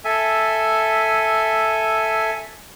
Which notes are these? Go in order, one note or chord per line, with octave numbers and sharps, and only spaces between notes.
A4 E5 G#5